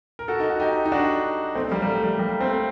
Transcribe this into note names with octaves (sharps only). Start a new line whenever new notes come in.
A#4
F#4 A4
D#4
F#4
D#4 G4
D#4
D4 F#4
A3 C4
G3 A#3
G3
A3
G3
G3 A#3
A3 C4